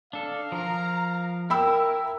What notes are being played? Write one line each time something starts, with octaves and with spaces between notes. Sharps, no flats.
D4 A4 F5
F3 A#4 A#5
E4 A#4 G5 B5 E6